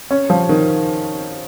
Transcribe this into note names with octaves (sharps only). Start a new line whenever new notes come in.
C#4
F3
D#3